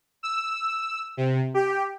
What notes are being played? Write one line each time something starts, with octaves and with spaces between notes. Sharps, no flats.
E6
C3
G4